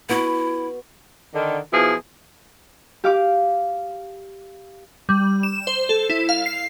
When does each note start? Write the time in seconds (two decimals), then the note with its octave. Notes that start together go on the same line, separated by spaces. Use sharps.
0.09 B3 E4 F#4
1.34 D3 D#3
1.72 B2 F3 E4 G#4
3.04 G4 F5 D6
5.09 G3
5.43 E7
5.67 C5
5.89 A4
6.10 E4
6.29 F5
6.46 C7